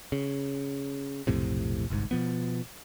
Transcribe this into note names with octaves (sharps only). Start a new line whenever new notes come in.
C#3
B1 F2 A2 C3
G1 C2 G#2
B2 F3 B3